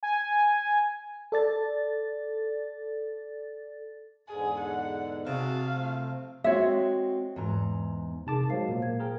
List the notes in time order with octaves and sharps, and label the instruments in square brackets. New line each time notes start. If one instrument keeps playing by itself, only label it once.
[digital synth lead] G#5
[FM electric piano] A4 D5 A6
[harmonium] E2 G#2 D3 [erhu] G#4
[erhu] F#5
[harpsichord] C3 [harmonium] F#4 G#4 A5 [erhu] F5
[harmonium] F3 A3
[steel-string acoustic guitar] G#3 C4 F#4 [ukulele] C#5 E5
[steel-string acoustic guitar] E2 G#2 A#5
[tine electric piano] C3 A5 D6 [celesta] D#4 G#4 A#4
[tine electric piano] F#3 G#3 [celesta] C5 F5 C7
[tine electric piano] A#2 A#3 [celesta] A#4
[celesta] G#6
[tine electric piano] G#4 A#4 G5